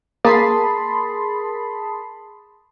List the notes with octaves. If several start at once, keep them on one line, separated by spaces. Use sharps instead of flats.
A#3 G#4 A#4 A5 B5 C6 D#6